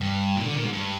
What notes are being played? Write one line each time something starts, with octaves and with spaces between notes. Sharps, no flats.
G2
A#2
D3
A#2
G#2
G2